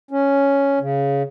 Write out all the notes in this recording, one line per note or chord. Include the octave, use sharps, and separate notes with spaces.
C#4
C#3